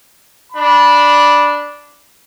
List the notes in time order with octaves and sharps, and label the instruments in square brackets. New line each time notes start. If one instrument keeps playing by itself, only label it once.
[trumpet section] D4 B5